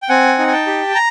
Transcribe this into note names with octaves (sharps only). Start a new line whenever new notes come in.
G5
C4 F#5 G#5
D#4
G#5
G5 A5
G4
A#5